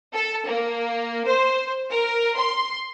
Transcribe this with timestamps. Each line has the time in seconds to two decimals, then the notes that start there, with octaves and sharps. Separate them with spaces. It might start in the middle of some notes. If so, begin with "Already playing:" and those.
0.14 A4
0.45 A#3
1.26 C5
1.90 A#4
2.37 C6